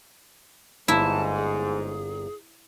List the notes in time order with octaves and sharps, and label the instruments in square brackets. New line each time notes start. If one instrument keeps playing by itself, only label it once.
[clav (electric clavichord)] G1 A#3 [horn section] G#2 [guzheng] E4 [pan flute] A5
[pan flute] G#4